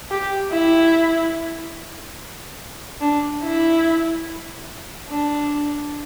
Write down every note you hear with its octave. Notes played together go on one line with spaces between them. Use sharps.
G4
E4
D4
E4
D4